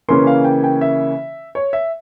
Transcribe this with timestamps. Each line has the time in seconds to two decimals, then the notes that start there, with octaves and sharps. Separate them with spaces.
0.08 C#3 E3 A#3 C#4 C6
0.27 F5
0.44 G5
0.64 G5
0.81 E5
1.55 C#5
1.73 E5